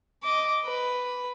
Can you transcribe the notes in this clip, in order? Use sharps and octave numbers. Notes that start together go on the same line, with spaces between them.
D#5 D6
B4